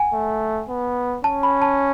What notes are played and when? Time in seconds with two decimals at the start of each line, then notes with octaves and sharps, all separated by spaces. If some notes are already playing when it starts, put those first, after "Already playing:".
Already playing: F#5 G#5
0.13 A3
0.69 B3
1.24 C#4 A5
1.43 B5
1.62 A5